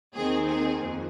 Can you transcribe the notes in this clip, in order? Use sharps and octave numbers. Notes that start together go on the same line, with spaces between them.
D#2 D#3 C4 G#4
G#4
F2